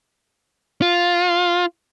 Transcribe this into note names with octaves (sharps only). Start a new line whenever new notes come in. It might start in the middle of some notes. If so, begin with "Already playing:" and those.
F4